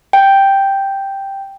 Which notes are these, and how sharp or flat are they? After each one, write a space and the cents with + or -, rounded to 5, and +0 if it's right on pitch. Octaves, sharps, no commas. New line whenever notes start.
G5 +0